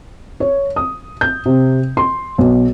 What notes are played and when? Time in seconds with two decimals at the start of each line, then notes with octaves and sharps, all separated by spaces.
0.40 C#5
0.76 D#6
1.21 G6
1.46 C3
1.97 C6
2.38 B1